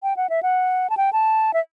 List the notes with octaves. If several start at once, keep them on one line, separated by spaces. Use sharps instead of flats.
G5
F#5
E5
F#5
A5
G5
A5
E5